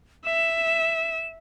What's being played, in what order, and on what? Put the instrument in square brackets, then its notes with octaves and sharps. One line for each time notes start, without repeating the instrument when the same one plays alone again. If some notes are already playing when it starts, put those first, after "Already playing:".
[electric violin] E5 [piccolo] E7